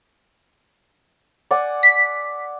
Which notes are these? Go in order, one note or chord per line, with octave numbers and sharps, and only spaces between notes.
D5 F#5 G#5
B6